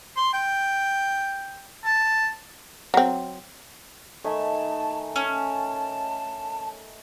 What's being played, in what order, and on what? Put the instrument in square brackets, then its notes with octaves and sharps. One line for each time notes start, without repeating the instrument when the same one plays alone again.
[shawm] C6
G5
A5
[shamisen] F#3 C4
[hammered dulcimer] D#3 D#5 B5 [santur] A3 G#5 [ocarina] A5
[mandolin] C#4 [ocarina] A5